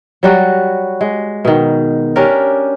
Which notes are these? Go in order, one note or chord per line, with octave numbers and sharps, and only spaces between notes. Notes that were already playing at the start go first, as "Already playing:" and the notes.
F#3 G3 F#4
G#3
B2 D#3
C#4 D4 G4 A#4